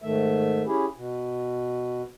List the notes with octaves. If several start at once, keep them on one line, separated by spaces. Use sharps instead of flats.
G#2 D#3 A3 E5
C#4 E4 G4 G#4
B2